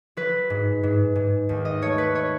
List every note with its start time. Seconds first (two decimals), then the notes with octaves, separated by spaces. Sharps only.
0.17 F#3 B4
0.50 G#2
0.83 G#2
1.16 G#2
1.49 D#2
1.65 D#5
1.82 A3 C#5
1.98 B4
2.15 C#5